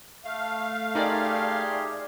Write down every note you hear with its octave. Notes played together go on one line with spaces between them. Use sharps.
A3 F5
A#2 D#4 G4 G#4 A#4 D5 C6